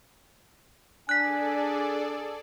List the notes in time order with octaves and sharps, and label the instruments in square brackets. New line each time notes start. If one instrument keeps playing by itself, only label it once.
[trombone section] D4 [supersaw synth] G#4 A4 D5 [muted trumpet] G#5 [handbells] F#6 B6